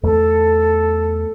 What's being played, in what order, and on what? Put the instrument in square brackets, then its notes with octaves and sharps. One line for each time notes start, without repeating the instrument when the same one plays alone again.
[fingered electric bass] E2 A3 [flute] A4